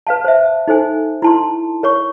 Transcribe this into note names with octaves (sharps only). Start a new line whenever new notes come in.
B4 F5 A5
C5 E5
D#4 A4 C5 G#5
E4 A5 C6
A#4 C#5 C#6